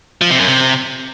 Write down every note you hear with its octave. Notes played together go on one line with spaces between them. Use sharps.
F3
C3
F#2
C3